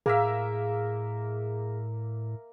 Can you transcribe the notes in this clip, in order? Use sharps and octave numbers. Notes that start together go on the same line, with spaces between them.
A2 A#3 G#4 A#4 E5